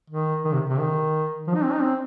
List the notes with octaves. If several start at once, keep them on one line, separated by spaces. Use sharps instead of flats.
D#3
D#3
C3
C3
D#3
F3
D#4
C4
D#4
C4